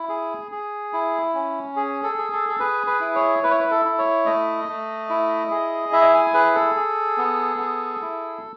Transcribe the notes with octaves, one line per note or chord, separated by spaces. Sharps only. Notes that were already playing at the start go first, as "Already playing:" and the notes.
Already playing: E4
G#4
G#4
E4
C#4
G#4
A4
G#4
A4
A4
G#4 B4
B4
E4
C#5
E4 B4
C#5
B4
A4
E4
C#5
A3 D#5
A3
E4
G#4
E4 E5
G#5
G#4 B4
A4
G#4
B3
G#4
E4